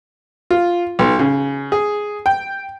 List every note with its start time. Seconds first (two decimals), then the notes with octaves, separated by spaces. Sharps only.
0.51 F4
0.99 B1
1.19 C#3
1.72 G#4
2.26 G5